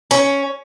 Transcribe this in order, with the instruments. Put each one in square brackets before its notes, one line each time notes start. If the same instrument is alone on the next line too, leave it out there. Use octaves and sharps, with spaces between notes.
[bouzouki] C#4